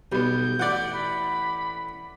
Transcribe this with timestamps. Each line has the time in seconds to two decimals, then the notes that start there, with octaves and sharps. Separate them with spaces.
0.12 B1 G3 B3 G6
0.59 A1 E4 D5 F#5
0.93 B5